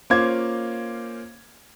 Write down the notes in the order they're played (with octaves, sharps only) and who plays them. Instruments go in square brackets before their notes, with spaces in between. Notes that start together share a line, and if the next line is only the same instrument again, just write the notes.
[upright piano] A#3 C#4 F4 C5 D6 G#6